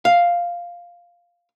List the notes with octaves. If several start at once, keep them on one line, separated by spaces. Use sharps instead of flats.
F5